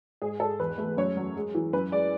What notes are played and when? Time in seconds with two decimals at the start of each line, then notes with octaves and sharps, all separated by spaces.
0.22 G#2 G#4
0.40 G#2 A4
0.59 E2 B4
0.78 A3
0.97 F#2 C#5
1.17 F#3
1.36 G#3
1.55 E3
1.73 F#2 B4
1.92 G#3 D5